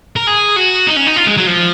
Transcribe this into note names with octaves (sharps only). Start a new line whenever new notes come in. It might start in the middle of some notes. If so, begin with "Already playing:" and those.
A#4
G#4
F#4
D#4
C#4
D#4
F4
G#3
F#3
F3